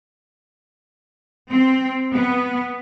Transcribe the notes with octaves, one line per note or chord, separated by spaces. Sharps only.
C4
B3